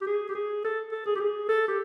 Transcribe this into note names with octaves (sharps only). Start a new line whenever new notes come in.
G4
G#4
G4
G#4
A4
A4
G#4
G4
G#4
A4
G4